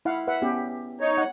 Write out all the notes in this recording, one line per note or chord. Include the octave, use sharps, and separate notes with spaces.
E4 F5 F#5
B4 E5 F#5
B3 C#4 G4
D#4 C#5
F#5